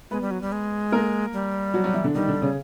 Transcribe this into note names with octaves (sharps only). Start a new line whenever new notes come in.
G#3 B3 B4
G3
F#3
G3
G#3
A#3 A#4
G3
F#3 F#4
F#3 F#4
E3 E4
D3 D4
D#3 G3 D#4
D3 D4
C#3 C#4